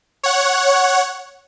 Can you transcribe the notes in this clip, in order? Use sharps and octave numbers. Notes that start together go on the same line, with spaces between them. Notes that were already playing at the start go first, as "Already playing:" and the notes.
C#5 F#5